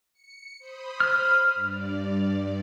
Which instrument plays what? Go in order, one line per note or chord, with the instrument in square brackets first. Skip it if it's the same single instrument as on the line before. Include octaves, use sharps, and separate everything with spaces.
[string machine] C#7
C5 B5 D#6
[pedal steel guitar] F6
[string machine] G2 D5